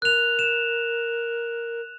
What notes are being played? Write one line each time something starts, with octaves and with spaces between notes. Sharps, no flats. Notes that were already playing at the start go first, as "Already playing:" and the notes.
A#4 F#6 F7
E7